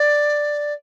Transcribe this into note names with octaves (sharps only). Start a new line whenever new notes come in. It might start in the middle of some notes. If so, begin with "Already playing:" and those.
Already playing: D5